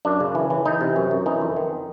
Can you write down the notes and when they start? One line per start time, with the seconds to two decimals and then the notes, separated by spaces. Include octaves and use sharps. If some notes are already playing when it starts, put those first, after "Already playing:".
0.05 F#2 D4
0.20 C#3
0.35 E3
0.50 E3
0.65 E3 D#4
0.81 C3
0.96 F#2
1.11 F#2
1.26 E3 D#4
1.41 F2
1.56 D#3